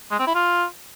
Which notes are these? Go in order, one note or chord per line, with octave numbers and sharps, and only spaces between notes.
G#3
C4
E4
F4